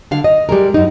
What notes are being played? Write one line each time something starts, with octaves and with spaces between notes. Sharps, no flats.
D3 F5
D#5
G3 G#3 A#4
F#2 D#4